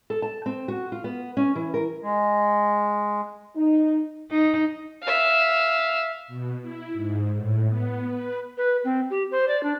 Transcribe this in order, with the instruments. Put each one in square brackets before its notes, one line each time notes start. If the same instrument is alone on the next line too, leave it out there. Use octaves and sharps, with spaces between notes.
[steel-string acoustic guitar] A4
A5
C4
F#4
F4
B3
C#4
E3
A#4
[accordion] G#3
[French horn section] D#4
[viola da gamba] D#4
[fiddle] E5 F5
[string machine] B2
E4
G#2
A2
B3
B4
[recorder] B4
C4
G4
C5
D5
D4